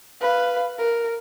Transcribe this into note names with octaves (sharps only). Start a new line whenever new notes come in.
B4 F5
A#4